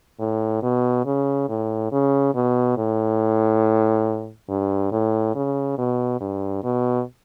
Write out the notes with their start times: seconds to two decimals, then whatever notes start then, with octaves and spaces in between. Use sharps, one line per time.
0.20 A2
0.62 B2
1.05 C#3
1.49 A2
1.92 C#3
2.35 B2
2.77 A2
4.49 G2
4.92 A2
5.35 C#3
5.78 B2
6.20 G2
6.64 B2